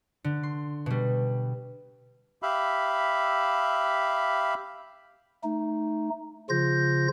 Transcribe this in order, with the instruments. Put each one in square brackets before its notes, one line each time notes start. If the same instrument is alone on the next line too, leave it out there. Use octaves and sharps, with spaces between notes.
[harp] D3
C6
B2 G3
[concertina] G4 E5 F5 B5
[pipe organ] A3 D#4
C#3 F3 F4 G6 A#6